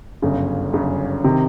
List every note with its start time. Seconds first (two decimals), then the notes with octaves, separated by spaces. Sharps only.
0.22 G1 F#2 C#3
0.73 G1 F#2 C#3
1.24 C3 D#3